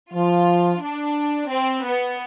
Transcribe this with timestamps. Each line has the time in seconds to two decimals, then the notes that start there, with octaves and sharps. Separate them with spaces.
0.13 F3 F4
0.83 D4
1.51 C4
1.85 B3